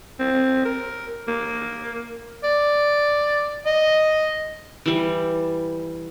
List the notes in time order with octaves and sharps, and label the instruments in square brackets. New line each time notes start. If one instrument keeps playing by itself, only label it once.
[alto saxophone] C4
A#4
A#3
[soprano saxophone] D5
D#5
[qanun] E3 G3